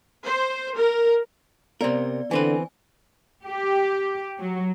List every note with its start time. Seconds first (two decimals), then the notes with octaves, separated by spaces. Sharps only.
0.24 C5
0.77 A#4
1.81 C3 B3 A#4 D5
2.31 D3 E3 C4 B4 G#5
3.45 G4
4.39 F#3